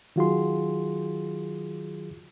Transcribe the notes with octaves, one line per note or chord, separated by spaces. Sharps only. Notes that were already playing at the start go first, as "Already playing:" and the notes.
D#3 F#3 F4 F#4 G#4 C6